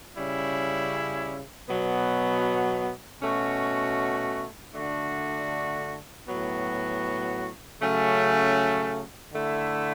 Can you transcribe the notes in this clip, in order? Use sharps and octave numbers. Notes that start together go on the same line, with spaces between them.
C#3 G3 C#4 E4
B2 F#3 B3
B2 A3 C#4 F#4
D3 A3 D4 F#4
A2 F#3 B3 F#4
C#3 F#3 A3 C#4
D3 A3 E4